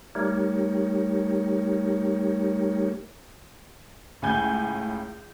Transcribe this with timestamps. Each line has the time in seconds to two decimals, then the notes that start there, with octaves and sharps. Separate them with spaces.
0.15 G3 A3 D#4 G4 A#4 C#5
4.22 C#2 A2 G#5 G6